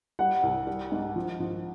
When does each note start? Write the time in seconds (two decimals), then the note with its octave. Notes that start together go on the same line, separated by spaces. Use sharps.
0.19 G3 F#5
0.43 C2
0.67 G3
0.92 G#2
1.16 F3
1.40 F3